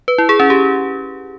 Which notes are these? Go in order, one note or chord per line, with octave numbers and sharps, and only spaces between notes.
B4
E4
G#4
C#4
G4